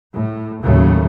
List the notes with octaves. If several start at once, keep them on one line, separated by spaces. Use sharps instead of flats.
A2
D#2 A2 C#3 F#3 A3